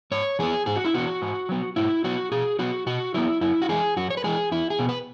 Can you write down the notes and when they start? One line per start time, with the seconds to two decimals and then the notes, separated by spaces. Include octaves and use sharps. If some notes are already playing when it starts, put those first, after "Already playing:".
0.12 G#2 C#5
0.39 E3 B3 G#4
0.66 G#2 G#4
0.76 F#4
0.85 E4
0.94 E3 B3 F#4
1.22 G#2
1.49 F#3 B3
1.76 G#2 E4
2.04 F#3 B3 F#4
2.32 B2 G#4
2.59 F#3 B3 F#4
2.87 B2 F#4
3.14 F#3 B3 E4
3.41 F#2 E4
3.62 F#4
3.69 E3 G#3 G#4
3.97 F#2 F#4
4.10 C#5
4.17 B4
4.24 E3 G#3 G#4
4.52 E2 E4
4.70 G#4
4.79 B2 B3
4.89 B4